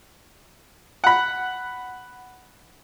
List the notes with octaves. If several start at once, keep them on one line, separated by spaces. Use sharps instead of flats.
F#5 B5